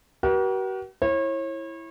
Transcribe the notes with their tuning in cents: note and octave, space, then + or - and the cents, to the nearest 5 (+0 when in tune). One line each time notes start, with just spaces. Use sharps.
F#4 +45 A#4 +45
E4 +0 C#5 -35